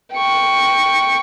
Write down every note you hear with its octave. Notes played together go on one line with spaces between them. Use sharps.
G5 C#6